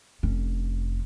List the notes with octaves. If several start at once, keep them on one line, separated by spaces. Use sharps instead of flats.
F1 C#4